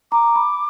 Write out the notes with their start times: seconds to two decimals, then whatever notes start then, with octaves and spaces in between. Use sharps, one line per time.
0.12 A#5 D6
0.36 B5